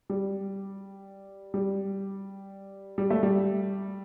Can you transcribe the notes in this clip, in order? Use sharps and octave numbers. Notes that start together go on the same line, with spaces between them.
G3
G3
G3
A3
G3